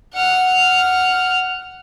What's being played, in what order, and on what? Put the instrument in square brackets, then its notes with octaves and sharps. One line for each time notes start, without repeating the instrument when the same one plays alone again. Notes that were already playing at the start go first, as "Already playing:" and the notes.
[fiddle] F#5 F6